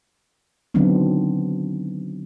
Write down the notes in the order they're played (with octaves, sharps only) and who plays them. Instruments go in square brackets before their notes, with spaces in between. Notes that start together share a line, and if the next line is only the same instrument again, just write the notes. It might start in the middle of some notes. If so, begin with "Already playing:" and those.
[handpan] D3 D#3 F#3 B3 C4 D4